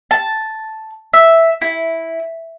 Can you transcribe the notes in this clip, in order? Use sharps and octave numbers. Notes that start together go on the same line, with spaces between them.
A5
E5
E4